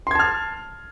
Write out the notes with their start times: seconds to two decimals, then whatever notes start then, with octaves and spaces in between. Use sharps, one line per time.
0.07 C6
0.11 G#6
0.15 A5
0.19 F6